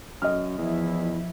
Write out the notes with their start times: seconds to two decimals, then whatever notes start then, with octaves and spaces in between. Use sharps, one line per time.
0.22 F#2 D#5 F6
0.58 E2 F3 E4